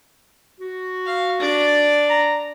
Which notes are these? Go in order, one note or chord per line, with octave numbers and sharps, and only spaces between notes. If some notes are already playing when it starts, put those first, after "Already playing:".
F#4
F5
D4 D5
A#5